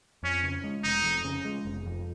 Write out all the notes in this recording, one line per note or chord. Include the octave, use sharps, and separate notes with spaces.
F2 C#4
C#3
G#3
F1 D#4
F2
C#3
G#3
F1
F2